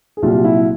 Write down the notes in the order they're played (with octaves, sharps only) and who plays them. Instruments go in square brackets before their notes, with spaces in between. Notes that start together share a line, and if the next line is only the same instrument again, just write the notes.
[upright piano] G#4
C2 A#2 F#3 F4 G4
E4 F#4